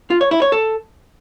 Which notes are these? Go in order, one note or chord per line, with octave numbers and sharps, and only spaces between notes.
F4
C#5
E4
C#5
A4